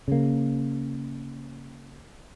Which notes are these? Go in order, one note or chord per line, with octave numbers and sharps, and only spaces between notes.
C#3 A#3